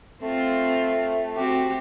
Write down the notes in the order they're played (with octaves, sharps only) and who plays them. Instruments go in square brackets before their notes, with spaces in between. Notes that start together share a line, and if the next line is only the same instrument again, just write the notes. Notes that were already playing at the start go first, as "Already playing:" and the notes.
[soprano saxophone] A3 [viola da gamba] C4 F4
[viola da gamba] C4 F#4 G4